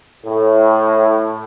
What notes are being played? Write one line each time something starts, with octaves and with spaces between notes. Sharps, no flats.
A2